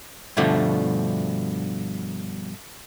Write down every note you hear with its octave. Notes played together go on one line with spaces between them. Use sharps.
G2 B2 D3 F3 A3